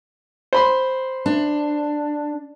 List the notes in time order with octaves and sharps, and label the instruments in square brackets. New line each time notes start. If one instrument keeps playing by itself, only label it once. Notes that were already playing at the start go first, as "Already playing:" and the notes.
[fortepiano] C5 B5 C6
[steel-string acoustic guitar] D4